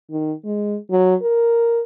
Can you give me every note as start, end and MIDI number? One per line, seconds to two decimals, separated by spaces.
0.10 0.32 51
0.45 0.77 56
0.91 1.15 54
1.22 1.82 70